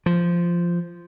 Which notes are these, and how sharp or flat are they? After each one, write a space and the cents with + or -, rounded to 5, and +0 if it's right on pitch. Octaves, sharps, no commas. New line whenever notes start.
F3 -10